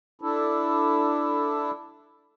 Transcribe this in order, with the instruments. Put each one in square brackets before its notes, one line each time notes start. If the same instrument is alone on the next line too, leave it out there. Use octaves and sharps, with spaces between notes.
[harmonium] D4 E4 A4